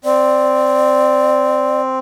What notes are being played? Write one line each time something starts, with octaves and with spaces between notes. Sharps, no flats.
C4 D5